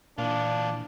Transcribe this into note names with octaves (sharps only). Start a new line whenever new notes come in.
A#2 E3 D4 F4